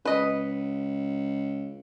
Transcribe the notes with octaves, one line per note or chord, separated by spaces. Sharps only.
C#2 B4 D#5